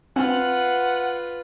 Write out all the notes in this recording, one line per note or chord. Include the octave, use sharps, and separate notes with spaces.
C4 F4 B4 F#5